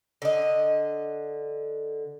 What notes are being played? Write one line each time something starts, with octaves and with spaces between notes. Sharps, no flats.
D3 D#5